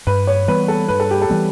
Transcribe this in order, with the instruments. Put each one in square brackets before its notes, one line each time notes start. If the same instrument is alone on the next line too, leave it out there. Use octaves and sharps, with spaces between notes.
[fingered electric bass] G2 [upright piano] B4
[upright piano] C#5
[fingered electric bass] E3 G3 B3 [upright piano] B4
[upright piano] A4
[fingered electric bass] G2 [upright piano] B4
[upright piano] A4
G4
A4
[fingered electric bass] E3 G3 B3